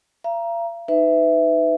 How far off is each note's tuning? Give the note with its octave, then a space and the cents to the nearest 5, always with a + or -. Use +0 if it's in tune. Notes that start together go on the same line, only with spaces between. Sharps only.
F5 -45 A#5 +10
D#4 +0 B4 +30 E5 +0